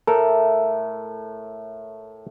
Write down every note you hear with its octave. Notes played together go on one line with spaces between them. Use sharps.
A2 A4 A#4